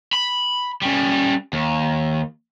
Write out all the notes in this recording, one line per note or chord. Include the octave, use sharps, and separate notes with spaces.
B5
G3 C#4
D#2